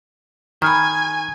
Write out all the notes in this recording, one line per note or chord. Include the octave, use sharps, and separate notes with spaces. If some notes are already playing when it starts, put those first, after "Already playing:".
D#3 G#5 B5 F6